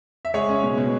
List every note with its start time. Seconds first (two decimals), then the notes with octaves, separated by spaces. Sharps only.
0.25 E5
0.34 G#3 G#4 C#5
0.48 C#4
0.63 B2
0.78 B2